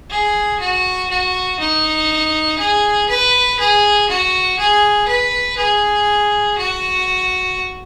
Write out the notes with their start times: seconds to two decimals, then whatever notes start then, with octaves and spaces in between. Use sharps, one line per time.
0.10 G#4
0.60 F#4
1.10 F#4
1.59 D#4
2.59 G#4
3.09 B4
3.59 G#4
4.09 F#4
4.59 G#4
5.08 B4
5.58 G#4
6.58 F#4